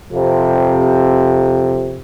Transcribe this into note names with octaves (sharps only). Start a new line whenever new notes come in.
F2 C3